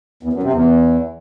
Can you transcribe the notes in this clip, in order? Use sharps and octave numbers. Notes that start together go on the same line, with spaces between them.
E2
F#2
C3
E2